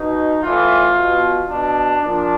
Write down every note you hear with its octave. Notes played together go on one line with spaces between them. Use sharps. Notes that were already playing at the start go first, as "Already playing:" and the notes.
Already playing: B2 D#4
A2 E3 F4
B2
B2 D4
A#2 F3 D4